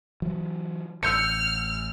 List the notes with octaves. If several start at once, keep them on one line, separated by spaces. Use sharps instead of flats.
E3 F#3
A1 E6 F6 G6 C#7